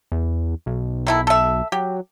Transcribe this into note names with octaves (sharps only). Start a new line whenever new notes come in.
E2
B1
D#3 E4 A4
A4 E5
F#3 G4